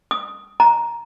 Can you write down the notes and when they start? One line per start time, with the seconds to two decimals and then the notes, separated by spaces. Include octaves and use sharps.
0.11 D#6
0.60 A#5